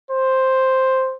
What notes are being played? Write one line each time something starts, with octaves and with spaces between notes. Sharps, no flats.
C5